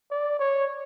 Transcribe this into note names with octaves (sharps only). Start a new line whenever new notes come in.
D5
C#5